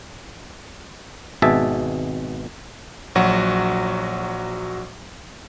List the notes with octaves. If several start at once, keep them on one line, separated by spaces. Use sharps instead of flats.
G#1 B2 G#4 E5 A5
A#1 F#3 F#4